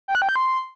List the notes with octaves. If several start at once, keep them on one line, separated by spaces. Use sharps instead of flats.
G5
F#6
G5
G6
C6